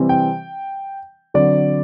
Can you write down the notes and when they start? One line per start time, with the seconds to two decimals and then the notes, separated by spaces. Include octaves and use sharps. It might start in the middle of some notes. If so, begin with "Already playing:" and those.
Already playing: C3 E3 G3 C4
0.09 G5
1.34 D3 F#3 C4 D5